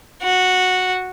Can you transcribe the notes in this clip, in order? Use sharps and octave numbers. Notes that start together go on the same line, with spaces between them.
F#4